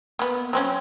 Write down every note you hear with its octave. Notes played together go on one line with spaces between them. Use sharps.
A#3 B3
F#3 C4 C#4